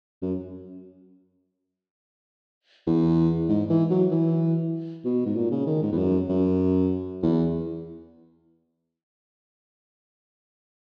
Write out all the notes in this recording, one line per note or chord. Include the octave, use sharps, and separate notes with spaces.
F#2
E2
G#2
E3
F#3
E3
B2
G#2
A#2
C#3
D#3
G#2
E2
F#2
F#2
E2